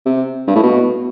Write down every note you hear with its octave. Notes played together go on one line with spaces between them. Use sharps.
C3
G2
A2
B2